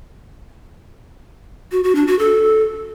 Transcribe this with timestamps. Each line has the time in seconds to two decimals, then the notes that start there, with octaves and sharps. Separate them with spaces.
1.72 F#4
1.84 F#4
1.95 D4
2.07 F#4
2.19 A4